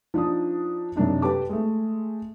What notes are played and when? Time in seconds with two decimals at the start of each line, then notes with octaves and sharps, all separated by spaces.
0.14 F3 D4 D#4 D#6
0.96 F#2 C3 D4 D#4
1.22 G4 A4 B4 A5 D6
1.49 G#3 A3